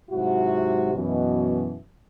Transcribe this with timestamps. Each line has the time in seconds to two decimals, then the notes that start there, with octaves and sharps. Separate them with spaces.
0.10 G#2 C3 F#3 E4 F#4
0.94 F#2 B2 E3